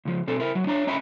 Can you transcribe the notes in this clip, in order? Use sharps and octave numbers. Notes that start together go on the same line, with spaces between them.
C#2 F3
B2 C4 A4
E4 A#4
F#3
D4 C#5 A#5
C#4 D#5 E5 G5 A#5 B5